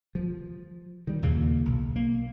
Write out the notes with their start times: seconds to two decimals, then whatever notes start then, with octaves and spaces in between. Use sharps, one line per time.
0.15 F3
1.07 D#3 G3
1.22 D#2 A#2 C#3 A#3
1.65 B1
1.96 A#3